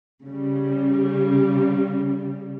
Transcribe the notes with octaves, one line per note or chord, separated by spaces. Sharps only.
C#3 G3